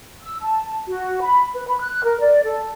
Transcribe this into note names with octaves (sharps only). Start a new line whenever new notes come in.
E6
A5
F#4
B5
B4
B5
F#6
A#4
D5
A4